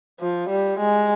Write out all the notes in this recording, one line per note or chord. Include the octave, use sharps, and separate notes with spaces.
F3
G3
G#3